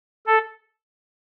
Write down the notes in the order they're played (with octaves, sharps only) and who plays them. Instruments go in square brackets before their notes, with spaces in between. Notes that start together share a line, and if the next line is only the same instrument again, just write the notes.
[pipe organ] A4